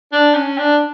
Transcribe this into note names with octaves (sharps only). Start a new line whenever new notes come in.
D4
C#4
D4